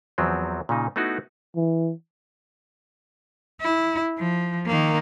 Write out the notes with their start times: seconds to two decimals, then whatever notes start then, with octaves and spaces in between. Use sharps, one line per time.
0.18 E2 F3 F#3 C4
0.69 A#2 C#3 D#4
0.96 A3 B3 D#4 E4 F#4
1.56 E3
3.61 E4
4.18 F3
4.66 D#3 A#3